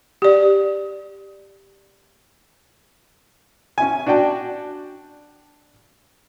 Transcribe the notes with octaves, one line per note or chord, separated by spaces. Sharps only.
G4 D5
C#4 E4 G#5
D4 F#4 D5 G5 A5